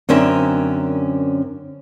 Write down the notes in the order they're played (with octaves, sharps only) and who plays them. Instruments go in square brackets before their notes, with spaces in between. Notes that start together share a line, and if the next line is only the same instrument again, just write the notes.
[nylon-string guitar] F#2 D3 C4 C#4 A#4 E5